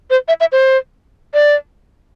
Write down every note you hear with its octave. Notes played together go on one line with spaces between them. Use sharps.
C5
E5
E5
C5
D5